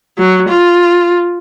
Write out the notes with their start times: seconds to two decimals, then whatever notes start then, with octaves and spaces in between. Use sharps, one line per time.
0.18 F#3
0.48 F4